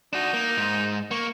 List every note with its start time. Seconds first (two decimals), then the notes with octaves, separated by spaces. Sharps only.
0.13 D4 D#4 F#4
0.34 A#3
0.57 G#2
1.11 A#3 C#6